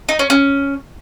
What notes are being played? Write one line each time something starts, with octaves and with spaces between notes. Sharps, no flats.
D#4
C#4
C#4